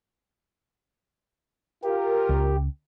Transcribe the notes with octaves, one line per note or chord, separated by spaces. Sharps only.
F4 G4 A#4
C#2